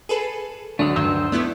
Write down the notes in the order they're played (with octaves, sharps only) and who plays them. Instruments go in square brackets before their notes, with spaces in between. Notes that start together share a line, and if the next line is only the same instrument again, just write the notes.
[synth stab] G#4 A4 B4
[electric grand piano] D2 F#3 D#6 [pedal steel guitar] D3 A3 [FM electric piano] D4
[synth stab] G2 D#3 [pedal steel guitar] C5 E6
[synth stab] A3 B3 E4 [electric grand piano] D5